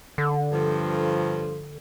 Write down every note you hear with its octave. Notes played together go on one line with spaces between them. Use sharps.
D3
G2 F3